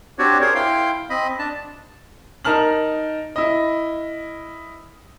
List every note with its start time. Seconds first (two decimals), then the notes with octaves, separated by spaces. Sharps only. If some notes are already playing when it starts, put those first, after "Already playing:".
0.19 C4 D4 F#4 G4 C#5 D5
0.41 G#4 A#4 C5 C#5
0.55 E4 F5 G5 C6
1.10 C4 D#5 B5
1.39 D4 A5
2.45 D#4 A#4 A5 F6 F#7
3.36 E4 D#5